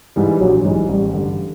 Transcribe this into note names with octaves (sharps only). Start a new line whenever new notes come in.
G#2 E3 G3
A#1 F#3
G#2 E3 G3
A1 G3
G2 D3